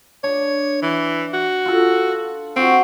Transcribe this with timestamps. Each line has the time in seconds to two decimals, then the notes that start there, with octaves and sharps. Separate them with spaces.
0.24 D4 C#5
0.83 E3
1.34 F#4
1.66 F4 A4
2.56 C4 F#4